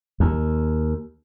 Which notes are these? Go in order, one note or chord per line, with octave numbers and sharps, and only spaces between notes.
D#2